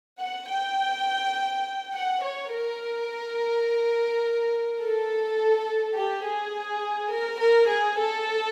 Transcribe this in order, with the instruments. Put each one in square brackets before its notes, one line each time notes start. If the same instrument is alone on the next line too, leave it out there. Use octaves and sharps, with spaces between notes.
[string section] F#5
G5
F#5
C#5
A#4
A4
G4
G#4
A#4
A#4
G#4
A4